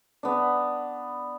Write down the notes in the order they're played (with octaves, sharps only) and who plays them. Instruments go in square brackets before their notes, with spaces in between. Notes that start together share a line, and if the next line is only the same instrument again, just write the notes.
[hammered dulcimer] B3 D4